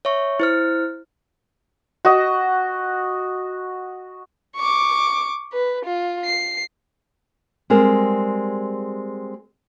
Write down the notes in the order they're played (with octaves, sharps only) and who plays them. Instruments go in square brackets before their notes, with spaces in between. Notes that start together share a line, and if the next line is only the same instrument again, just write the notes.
[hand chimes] C#5 E5 C#6
E4 C5 F6
[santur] F#4 D#5
[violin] C#6 D6
B4
F4
C7
[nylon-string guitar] G3 G#3 C4 A#4